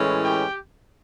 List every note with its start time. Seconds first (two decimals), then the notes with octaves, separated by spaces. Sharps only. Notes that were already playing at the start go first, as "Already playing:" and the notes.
Already playing: A2 E3 G#3 C#4
0.24 G4 G5